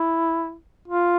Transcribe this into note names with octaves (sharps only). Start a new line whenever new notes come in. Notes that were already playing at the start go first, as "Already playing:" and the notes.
Already playing: E4
F4